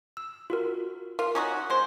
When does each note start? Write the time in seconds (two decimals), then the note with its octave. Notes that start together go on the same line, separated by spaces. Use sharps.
0.17 E6
0.50 F4 F#4 A#4
1.19 F4 A#4
1.35 C#4 D#4 F#4
1.70 G#3 C5